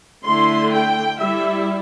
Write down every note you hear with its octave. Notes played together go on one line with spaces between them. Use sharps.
D3 A3 E4 C6
G5
G3 E4 E5